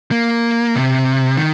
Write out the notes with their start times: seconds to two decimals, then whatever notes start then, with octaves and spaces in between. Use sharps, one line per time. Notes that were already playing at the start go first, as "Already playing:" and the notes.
0.11 A#3
0.75 C3
1.37 D#3